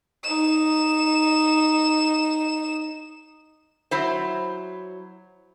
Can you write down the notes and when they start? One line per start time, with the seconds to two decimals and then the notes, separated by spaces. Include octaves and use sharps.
0.24 D#4 E7
3.91 F#3 E4 C5